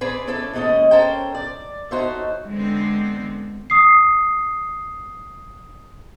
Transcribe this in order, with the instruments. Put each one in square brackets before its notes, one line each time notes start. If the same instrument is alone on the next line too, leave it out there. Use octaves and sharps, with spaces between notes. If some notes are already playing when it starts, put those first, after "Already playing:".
[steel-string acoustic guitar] C4 G#4 B4 D5
C#4 E4 A4 B4 D5
D#2 G#2 G#3 C#4 A4 D#5
C#4 A4 A#4 C5 G5
D5
D#4 F#4 A4 C5 C#5 E5
[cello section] D3 G#3 B3 C4
[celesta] D#6 C7